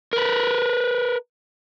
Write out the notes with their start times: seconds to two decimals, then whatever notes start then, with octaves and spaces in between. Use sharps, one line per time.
0.13 A#4 B4